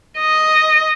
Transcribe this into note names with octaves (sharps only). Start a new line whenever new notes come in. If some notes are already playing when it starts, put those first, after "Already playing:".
D#5